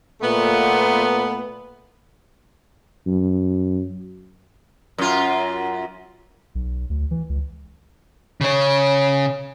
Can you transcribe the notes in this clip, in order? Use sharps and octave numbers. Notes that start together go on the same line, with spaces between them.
A#2 A3 B3
F#2
F#2 F4
B1
D2
E3
C#2
C#3 C#5